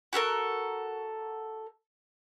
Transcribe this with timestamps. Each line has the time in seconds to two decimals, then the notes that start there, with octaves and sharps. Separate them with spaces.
0.13 F#4 G4 A4 A#4